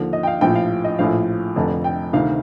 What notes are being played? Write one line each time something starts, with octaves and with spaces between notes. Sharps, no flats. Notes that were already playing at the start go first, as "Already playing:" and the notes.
Already playing: D#2 D3 F3
D#5
G5
F5
A#1 A2 F3 G5
F5
D#5
A#1 A2 F3 F5
F1 F2 D3
G5
D2 C3 D#3 F5